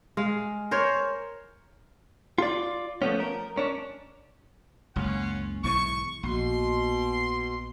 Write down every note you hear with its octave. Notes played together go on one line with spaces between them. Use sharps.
G#3 F5
A#4 C5 C#5
F4 D5
F3 A3 B3 C#4
A#4
C#4 D4
F#1 C#2 C#4 F4 F#5
B1 G#2 E3 C#6
A#1 B2 C6